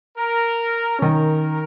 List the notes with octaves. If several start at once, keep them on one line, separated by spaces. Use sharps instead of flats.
A#4
D#3 C#4 A#4